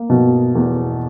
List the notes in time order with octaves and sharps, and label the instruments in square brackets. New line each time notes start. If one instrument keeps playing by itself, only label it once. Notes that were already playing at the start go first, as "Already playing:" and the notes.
Already playing: [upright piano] A#3
B2
E2